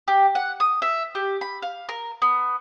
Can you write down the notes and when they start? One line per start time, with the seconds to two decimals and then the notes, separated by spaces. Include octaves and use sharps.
0.08 G4
0.35 F#5
0.60 D#6
0.82 E5
1.15 G4
1.41 B5
1.62 F5
1.89 A#4
2.22 B3